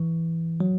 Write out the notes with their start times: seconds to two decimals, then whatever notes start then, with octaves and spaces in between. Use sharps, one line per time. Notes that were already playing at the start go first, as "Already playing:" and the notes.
Already playing: E3
0.60 F#3